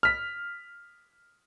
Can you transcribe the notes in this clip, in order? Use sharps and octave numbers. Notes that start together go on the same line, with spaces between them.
F6 B6